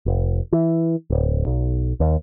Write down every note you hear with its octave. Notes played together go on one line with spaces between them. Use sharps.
F1
E3
D1
B1
D#2